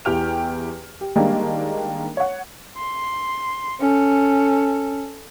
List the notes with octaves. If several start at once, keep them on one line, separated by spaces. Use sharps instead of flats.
E2 E4 G4 G5 F6 F7
G4
D#3 G3 G#3 A#3 D4
C#5 F#5
C6
C#4 A4